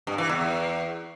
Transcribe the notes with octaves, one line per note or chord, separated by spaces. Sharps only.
G2
E3
E2